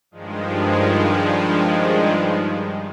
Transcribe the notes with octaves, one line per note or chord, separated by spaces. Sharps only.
G2 D#3 F3 G#3